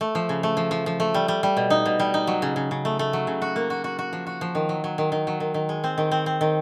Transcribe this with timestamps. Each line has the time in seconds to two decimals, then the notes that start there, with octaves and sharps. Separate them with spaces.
0.01 A3
0.15 F3
0.29 C#3
0.43 A3
0.57 F3
0.71 F3
0.86 F3
1.00 A3
1.14 G3
1.28 G3
1.43 G3
1.57 B2
1.70 D#4
1.86 B2
2.00 G3
2.14 D#4
2.27 F#3
2.42 C#3
2.56 C#3
2.71 C#3
2.85 A3
2.99 A3
3.13 F#3
3.27 C#3
3.42 F#4
3.56 A#3
3.70 F#4
3.84 F#4
3.99 F#4
4.13 F3
4.27 F#4
4.41 F3
4.55 D#3
4.69 F#3
4.84 F#3
4.98 D#3
5.12 D#3
5.27 F#3
5.40 D#3
5.54 D#3
5.69 G#3
5.84 C4
5.98 D#3
6.12 C4
6.26 C4
6.41 D#3